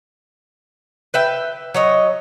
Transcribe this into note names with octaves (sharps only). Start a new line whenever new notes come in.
B4 E5 G5
F#3 C#5 D#5